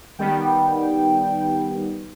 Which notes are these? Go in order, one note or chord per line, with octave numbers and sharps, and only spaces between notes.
D#3 G3 B3 G5